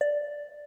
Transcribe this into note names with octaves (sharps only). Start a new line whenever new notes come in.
D5